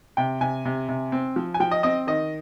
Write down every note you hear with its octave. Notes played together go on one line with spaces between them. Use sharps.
C3 G5
C3 G#5
C3
C3
C4
F3
G#5
F3 G5
D#5
C4 D#5
D#3 D#5